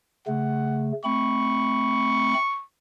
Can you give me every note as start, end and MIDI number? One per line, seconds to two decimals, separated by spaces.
0.27 0.92 49
0.27 0.92 57
0.27 0.92 78
1.04 2.34 57
1.04 2.34 60
1.04 2.34 83
1.04 2.62 85